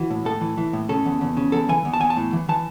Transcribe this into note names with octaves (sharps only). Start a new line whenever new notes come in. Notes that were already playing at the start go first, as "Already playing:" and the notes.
Already playing: E3 F#4
A2
A2 A4
E3
E3
A2
C#3 A4
E2
E2
C#3
E2 A4
E3 G#5
E2
A5
E2 G#5
A5
A2
E3
E3 A5